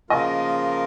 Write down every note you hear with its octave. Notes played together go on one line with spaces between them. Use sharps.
C#3 F3 A#3 F4 A#4 D#5